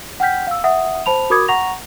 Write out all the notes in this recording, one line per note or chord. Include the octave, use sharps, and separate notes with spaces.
F#5 G5 F6 G6 B6
F5 E6
E5 F#5 D#6
C5 A5 B5 F7
F#4 A#4 B5 D6 D#6 G#6
F#5 A#5 C#6 A#6 F7